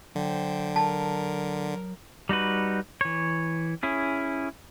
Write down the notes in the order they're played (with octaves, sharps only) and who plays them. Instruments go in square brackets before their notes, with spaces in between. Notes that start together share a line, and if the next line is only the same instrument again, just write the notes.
[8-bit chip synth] D3 [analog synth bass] F#3 [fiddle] C5 G5
[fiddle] A#4 [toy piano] A5
[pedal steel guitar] G3 D#4 F#4 B4
E3 C#5
C#4 E4 G#4